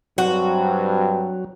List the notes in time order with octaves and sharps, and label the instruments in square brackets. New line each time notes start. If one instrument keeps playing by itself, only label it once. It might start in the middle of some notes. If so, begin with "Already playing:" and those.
[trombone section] G2 C4 [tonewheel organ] F#3 [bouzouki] F#4